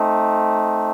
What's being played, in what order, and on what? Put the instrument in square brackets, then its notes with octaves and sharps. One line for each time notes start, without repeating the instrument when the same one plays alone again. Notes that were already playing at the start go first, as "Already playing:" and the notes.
Already playing: [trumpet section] A3 C4 D#4